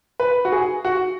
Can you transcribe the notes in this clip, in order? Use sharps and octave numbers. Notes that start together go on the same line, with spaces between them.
B4
F#4
G#4
F#4